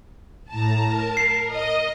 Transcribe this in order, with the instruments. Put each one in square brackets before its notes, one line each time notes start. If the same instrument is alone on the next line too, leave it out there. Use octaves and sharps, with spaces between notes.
[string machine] A2 A#5 [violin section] A5
[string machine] A#4
[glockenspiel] C7
[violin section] D#5